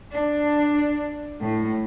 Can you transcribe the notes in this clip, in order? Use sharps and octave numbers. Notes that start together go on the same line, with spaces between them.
D4
A2